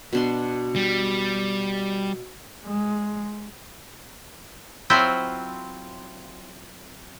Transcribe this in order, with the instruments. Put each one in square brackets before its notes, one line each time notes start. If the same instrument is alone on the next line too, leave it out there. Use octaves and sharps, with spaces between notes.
[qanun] B2 D4 C6
[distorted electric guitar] G3
[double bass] G#3
[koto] F#3 C4 E4 F4 C5